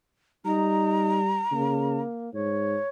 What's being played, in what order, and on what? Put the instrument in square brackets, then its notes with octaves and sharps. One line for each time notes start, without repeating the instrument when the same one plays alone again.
[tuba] G3 [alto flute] D#4 [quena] A#5
[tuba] C#3 [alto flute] A#3
[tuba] G#2 [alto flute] C#5